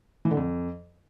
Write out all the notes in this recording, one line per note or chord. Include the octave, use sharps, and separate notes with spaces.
E3
D3
F2